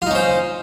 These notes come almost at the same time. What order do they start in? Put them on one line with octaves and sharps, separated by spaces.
F4 D#4 C#4 C5